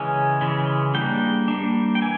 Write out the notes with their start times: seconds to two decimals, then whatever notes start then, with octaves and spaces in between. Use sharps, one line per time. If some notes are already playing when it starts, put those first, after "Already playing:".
Already playing: C#3 E3 G#3 C#4 G#5
0.41 C#3 E3 G#3 C#4
0.94 G3 A#3 D4 G5
1.48 G3 A#3 D4
1.95 G5
2.02 E3 G#5